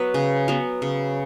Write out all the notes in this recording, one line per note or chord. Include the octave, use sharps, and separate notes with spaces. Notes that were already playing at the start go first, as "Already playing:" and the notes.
Already playing: F#3 B3 B4
C#3
F#3 B3
C#3